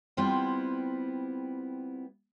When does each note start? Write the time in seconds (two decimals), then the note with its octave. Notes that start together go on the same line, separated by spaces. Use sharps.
0.17 G3 B3 C4 E4 F4